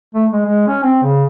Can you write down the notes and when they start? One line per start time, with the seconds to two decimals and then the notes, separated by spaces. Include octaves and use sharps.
0.15 A3
0.32 G#3
0.46 G#3
0.67 C#4
0.83 C4
1.03 C#3